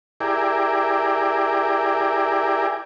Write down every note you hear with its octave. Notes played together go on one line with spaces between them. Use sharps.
E4 G4 G#4 A#4 D5